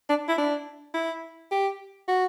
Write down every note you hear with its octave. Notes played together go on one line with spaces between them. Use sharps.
D4
E4
D4
E4
G4
F#4